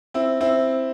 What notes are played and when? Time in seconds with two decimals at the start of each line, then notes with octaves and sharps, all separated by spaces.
0.14 C4 E4
0.41 C4 E4